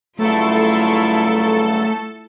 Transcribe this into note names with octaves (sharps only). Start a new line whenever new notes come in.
G2 C#3 F#3 A3 E4 F4 A4